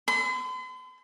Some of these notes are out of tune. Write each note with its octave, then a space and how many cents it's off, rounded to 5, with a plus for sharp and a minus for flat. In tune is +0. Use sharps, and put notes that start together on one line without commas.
C6 -45